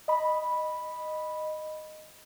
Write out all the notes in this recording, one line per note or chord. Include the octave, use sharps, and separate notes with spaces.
D#5 B5